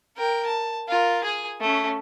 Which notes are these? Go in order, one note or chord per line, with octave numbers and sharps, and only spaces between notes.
A#4 G5
A5
F4 A#4
G#4 G#5
A3 C#4